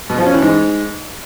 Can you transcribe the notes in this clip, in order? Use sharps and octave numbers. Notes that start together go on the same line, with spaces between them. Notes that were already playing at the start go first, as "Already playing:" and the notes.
B2
F3
C#4
E3
G#2